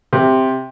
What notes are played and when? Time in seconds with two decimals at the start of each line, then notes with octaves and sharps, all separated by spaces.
0.13 C3